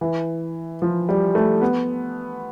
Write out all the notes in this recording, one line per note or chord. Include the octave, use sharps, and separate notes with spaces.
E3
F3
G3
A3
B3